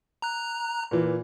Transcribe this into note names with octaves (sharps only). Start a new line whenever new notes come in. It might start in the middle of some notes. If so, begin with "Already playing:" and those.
A#5 F#6
A#2 E3